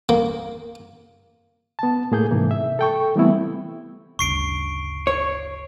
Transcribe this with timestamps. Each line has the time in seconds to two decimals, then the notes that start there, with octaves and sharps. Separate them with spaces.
0.09 A#3
1.79 B3 A5
2.12 A2 A#3 G#4 A4 G6
2.31 G#2 C3 E3 A#3
2.51 E5
2.79 A4 G5 C#6
3.16 E3 G3 A3 B3 C4 E4
4.19 G1 D2 C#3 C#6 C7 D7
5.07 C#5